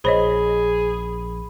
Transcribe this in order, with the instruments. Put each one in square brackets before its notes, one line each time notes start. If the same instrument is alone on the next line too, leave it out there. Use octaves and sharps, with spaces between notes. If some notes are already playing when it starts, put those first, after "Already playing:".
[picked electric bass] A#1 [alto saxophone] G#4 [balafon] C5 C#5 D#5 [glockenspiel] B5